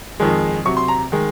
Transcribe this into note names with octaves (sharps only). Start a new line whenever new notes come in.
F2 D#3 G#3
C3 F#3 C#6
C6
A#5
D#3 G#3